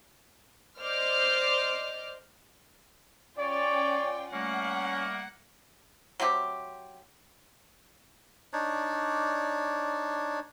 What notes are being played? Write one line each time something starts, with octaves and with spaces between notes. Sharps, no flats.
C5 D5 D#5 D6 F6 G6
C#4 F4 C#5 D5 G5
G3 A3 A#3 C#4 F#5
F#3 A3 C4 G4
D4 D#4 C#5 D5